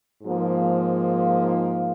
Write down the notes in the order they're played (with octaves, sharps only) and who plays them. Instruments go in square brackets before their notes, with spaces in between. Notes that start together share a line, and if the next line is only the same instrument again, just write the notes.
[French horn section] G#2 F3 A#3